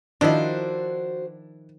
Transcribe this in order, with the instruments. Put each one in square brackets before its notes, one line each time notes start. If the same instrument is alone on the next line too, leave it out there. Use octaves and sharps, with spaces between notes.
[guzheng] D#3 F3 [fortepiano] D4 E4 D#5 [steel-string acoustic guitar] F#4 C5